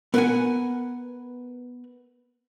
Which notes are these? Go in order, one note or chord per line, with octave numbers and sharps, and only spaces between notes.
B3 A#4 B4 F5 F#5 G#5